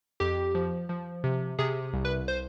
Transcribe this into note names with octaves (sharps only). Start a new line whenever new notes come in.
F2 G4
F3
F3
C3
C3 G#4
C2
B4
C5